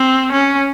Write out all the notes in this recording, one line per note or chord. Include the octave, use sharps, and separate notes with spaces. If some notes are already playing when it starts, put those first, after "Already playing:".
Already playing: C4
C#4